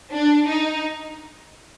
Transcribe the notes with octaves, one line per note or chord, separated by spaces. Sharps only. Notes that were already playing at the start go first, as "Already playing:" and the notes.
D4
D#4